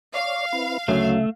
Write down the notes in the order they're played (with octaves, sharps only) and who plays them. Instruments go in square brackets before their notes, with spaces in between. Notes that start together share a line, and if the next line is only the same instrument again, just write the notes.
[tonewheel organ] C#5 D5 [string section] F5
[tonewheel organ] C4 E4 B4
[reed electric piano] D2 F#3 C#4 [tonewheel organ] C#3 E5 [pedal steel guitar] A3